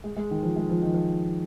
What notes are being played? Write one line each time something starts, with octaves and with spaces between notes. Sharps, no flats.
G#3
G#3
D#3
F3
G#3
F3
D#3
F3